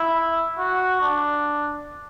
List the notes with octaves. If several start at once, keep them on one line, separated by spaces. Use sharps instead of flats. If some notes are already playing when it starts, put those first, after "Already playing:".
Already playing: E4
F#4
D4